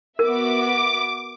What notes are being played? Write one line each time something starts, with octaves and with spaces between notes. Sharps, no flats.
B3 F#4 A#4 E5 D6